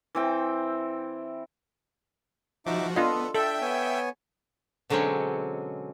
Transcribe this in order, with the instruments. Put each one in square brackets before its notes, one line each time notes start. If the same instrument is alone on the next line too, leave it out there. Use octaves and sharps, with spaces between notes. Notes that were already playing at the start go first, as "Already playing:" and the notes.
[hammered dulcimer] E3 C4 G5
[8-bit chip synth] F3 F#4 [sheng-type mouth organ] D#4 E5 D6
[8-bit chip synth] B3 [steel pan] D4 F4 D#5 [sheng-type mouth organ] A4
[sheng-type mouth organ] D4 [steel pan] A4 [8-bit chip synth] E5 G5
[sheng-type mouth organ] B3 C#5 G#5
[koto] B2 D3 F#3 G#3 C4 C#4